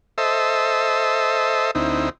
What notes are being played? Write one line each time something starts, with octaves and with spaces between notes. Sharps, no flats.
A4 C5 D#5 E5
D2 C4 D#4 E4